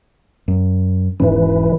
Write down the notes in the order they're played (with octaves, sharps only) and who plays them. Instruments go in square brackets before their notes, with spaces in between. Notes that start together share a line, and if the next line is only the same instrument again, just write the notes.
[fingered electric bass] F#2
[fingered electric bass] E1 G#2 C#4 [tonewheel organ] E3